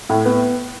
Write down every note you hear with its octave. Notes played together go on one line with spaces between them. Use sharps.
A2
B3